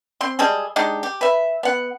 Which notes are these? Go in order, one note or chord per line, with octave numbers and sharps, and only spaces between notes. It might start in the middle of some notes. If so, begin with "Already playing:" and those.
C4 C6
G3 G#3 G#4 A4
G#3 D4 D#4 G4
G4
B4 E5
B3 F#5